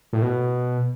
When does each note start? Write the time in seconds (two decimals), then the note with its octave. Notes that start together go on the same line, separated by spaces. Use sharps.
0.13 A2
0.22 B2